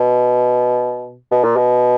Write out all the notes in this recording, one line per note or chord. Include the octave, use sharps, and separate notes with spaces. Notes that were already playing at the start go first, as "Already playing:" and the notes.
Already playing: B2
B2
A#2
B2